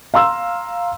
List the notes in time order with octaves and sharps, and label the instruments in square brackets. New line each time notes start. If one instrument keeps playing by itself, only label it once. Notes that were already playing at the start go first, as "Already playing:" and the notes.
[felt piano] F5 A#5 C6 E6